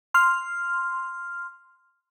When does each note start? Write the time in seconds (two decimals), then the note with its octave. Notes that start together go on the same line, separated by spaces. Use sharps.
0.14 C6 F6